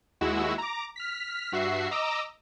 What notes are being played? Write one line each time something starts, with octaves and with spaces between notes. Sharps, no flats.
D#2 G#3 E4 F#4 E6
A#5 D6
F6 B6
G2 F#4 E5 C7
D#5 A#5 D6 E6